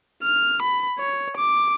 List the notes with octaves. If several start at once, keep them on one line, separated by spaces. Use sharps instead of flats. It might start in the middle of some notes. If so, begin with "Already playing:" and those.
F6
B5
C#5
D6